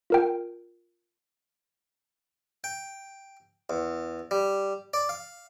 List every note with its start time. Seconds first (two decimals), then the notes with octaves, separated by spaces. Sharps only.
0.10 F4 A#4 G5
2.64 G5
3.70 E2
4.31 G3
4.94 D5
5.09 F5